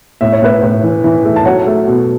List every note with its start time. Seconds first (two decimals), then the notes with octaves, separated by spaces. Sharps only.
0.21 A2 E5
0.32 C#5
0.42 A2 B4 E5
0.62 A2
0.83 E3
1.04 E3
1.25 A3
1.36 A5
1.45 F#3 C#5 F#5
1.67 A3
1.87 B2